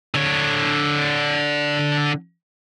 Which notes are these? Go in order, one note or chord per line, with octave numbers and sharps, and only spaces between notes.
D3 C#5